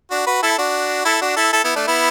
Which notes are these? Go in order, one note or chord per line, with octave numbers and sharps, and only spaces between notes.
D4 F#4
F#4 B4
E4 A4
D4 F#4
E4 A4
D4 F#4
E4 A4
E4 A4
B3 E4
A3 D4
B3 E4